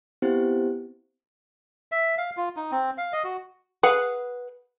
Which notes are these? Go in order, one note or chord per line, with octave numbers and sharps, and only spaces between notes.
B3 C4 E4 G4 C5
E5
F5
F4
D#4
C4
F5
D#5
F#4
G#4 B4 F5 F#5